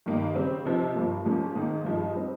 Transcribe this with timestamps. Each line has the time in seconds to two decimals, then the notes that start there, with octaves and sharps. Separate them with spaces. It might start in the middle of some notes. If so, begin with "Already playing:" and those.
0.06 G2 D#3 A#3 D#4
0.35 C#3 G3 C4
0.65 C3 F3 C4 D#4
0.95 G2 F3 A#3
1.25 G#2 F3 A#3 C#4
1.56 G#2 D#3 A#3 D#4
1.84 G2 F3 G#3 D#4
2.15 G3 C4 D#4